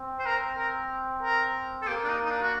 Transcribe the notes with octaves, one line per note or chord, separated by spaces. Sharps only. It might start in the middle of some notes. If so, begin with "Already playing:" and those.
Already playing: C4
C5
A#4
A#4
A#4
A4
A#3 G4
D4
D#4
D#4
D4
F#4